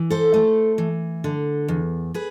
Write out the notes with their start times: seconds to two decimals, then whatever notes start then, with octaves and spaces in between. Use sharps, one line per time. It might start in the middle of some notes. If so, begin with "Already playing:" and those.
Already playing: E3
0.10 A4 C5
0.34 A3
0.78 E3
1.24 D3
1.68 E2
2.14 G#4 B4